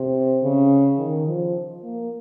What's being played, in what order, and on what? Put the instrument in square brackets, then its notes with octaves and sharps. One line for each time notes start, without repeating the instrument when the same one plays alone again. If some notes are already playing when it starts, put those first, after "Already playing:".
Already playing: [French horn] C3
C#3
D#3
F3
A#3